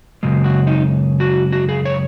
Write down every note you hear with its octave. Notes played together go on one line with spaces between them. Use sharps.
F#2 C#3 G#3
F#4
D#4
F#4
F#4
G#4
C#5